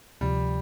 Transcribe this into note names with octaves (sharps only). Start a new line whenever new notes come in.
D2 C3 F3 G3